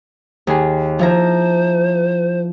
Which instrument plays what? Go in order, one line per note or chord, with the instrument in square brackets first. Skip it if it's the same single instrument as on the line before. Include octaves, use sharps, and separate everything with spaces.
[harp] D#2 G#4
[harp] F3 E4 A#5 [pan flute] C5